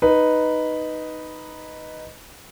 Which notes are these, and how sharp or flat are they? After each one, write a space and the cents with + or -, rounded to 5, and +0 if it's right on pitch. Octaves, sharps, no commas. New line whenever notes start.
D#4 +0 B4 +0